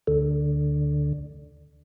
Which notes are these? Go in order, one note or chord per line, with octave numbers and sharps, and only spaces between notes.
D2 D3